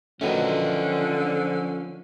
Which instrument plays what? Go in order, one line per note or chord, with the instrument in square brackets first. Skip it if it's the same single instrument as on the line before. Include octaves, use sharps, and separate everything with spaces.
[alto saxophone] D3 [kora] D#3 F#3 A3 [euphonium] F3 [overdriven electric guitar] C#4 B4